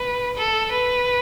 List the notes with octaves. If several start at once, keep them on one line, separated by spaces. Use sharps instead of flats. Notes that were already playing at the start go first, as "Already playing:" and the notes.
Already playing: B4
A4
B4